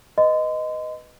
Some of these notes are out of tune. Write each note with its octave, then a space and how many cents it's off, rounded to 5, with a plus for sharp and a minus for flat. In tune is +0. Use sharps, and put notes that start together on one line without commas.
B4 +0 D#5 +0 C6 -35